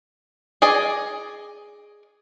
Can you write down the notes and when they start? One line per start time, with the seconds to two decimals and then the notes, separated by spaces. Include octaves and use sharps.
0.62 G#4 D5 D#5